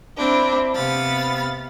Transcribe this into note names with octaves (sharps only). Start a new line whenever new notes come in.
C4 D4 E4
C3 B3 F5 B5 A6